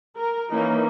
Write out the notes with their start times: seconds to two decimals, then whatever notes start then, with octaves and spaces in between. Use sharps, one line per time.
0.17 A#4
0.51 E3 A#3 C#4 D#4